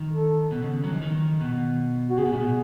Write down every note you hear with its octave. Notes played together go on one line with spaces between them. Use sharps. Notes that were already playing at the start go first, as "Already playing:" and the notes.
Already playing: D#3
A4
B2
C#3
F#3
E3
D#3
B2
F#4
C#3 G#4
B2
A2
B2